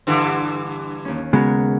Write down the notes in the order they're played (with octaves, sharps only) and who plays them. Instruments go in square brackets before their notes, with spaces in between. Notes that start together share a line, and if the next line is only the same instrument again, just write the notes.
[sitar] G2 D3 E3
[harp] D#2 C#4
[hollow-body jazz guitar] C#3 G#3 [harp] B3 F#4 A#4